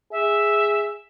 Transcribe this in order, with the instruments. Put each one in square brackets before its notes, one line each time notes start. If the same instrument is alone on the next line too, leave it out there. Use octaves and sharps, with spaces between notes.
[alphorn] G#4 [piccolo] E5